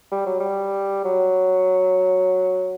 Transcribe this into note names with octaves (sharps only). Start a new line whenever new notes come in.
G3
F#3
G3
F#3